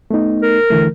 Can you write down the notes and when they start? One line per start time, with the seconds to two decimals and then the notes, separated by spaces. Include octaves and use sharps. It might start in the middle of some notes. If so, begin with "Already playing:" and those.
0.11 A3 B3 D#4
0.42 A#4
0.70 D3 E3 A3